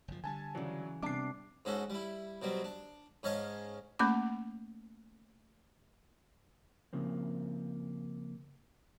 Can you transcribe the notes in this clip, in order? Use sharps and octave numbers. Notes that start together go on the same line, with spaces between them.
F#1 F3
D3 G3 G#5 A5
C#3 E3 F#3 D5
C3 G3 B3 D4 D6 C7
G#2 C#4 F#4 A4
G3 E4
B2 F#3 G3 C4
D4
G#2 C#4 C#5 D#5 F5 A5
A3 A#3 C#4 B5 D6
C#3 F3 A#3 C4